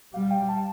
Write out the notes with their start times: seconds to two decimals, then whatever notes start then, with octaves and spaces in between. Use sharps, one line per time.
0.13 G3 F5
0.31 G5
0.49 A5